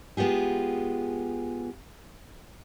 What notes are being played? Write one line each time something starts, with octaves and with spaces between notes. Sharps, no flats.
G#3 B3 F4 G4 G#4